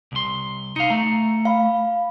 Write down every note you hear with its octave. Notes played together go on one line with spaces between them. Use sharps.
C2 C6
D#4 F5 C#7
A3 A#5
F5 B5